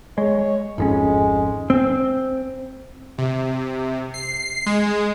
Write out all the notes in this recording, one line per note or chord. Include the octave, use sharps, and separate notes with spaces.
G#3 C#5
G#1 F2 G#3 C#4
C4
C3
C7
G#3